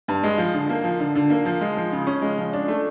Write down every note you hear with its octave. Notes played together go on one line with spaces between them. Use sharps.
G2
G#3
F3
D3
A#3
F3
D3
D3
A#3
F3
G#3
F3
C#3
C#4
G#3
F3
D4
A3